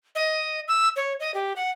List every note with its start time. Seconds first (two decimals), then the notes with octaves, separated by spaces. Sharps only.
0.15 D#5
0.68 E6
0.96 C#5
1.20 D#5
1.34 G4
1.56 F#5